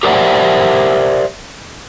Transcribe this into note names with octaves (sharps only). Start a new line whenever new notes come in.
G4 A#4 C5 D5 E5 F#5